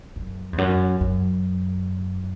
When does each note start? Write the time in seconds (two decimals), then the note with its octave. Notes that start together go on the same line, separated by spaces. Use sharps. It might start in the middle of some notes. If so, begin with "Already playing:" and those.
0.16 F#2
0.53 E2
0.58 F#2
1.01 F#2